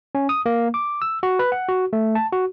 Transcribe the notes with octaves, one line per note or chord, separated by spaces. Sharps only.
C#4
D#6
A#3
D6
E6
F#4
B4
F#5
F#4
A3
A5
F#4